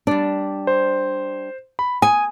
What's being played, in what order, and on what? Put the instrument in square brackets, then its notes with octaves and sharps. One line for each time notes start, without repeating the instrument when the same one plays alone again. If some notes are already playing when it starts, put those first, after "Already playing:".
[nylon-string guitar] G3 D4
[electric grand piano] C5
B5
[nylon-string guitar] G#5 [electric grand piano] D#6